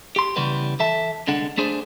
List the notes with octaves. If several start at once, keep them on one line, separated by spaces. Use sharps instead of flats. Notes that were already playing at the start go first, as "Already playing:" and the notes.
G4 C6
C#3 E3 G3 B3 B4
E3 A4 E5 A5
C2 D3 G#3 D4 F#5
A3 D4 G#4 C5